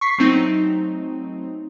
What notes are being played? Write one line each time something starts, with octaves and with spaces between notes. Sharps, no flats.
C#6 B6 C7
F#3 A3 C4 D#4